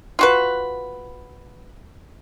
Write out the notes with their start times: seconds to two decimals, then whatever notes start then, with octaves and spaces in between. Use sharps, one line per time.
0.19 F4 F#4 B4